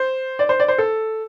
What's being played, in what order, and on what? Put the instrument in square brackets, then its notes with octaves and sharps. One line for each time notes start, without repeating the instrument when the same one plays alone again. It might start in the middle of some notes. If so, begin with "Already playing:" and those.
Already playing: [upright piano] C5
D5
C5
D5
C5
A4